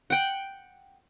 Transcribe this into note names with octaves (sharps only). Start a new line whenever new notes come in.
F#5 G5